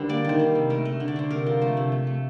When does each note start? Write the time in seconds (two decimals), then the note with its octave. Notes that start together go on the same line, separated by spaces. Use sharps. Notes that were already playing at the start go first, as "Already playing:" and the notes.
Already playing: D3 G3 A#4 C5
0.09 A#3 D5
0.25 D#3 C5
0.39 G3
0.55 C3
0.70 A3 A#4
0.85 A3
1.00 D3
1.08 D5
1.16 D3 C5
1.31 C3 A#4
1.46 F3
1.61 A3 C5
1.77 C3
1.92 A3
2.07 A3